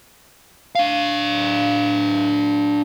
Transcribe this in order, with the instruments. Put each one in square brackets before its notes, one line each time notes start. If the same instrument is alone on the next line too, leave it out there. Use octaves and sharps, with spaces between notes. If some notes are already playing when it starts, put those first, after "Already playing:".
[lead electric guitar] D4 F5